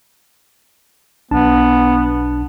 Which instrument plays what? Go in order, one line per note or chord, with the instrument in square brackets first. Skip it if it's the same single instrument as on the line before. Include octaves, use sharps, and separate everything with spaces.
[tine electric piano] B1 D4 A5 [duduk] B3